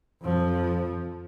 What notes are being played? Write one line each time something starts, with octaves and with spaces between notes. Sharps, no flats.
F2 F3